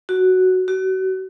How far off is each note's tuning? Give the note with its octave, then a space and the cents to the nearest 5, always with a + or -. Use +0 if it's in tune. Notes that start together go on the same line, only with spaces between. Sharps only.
F#4 +5
F#4 +35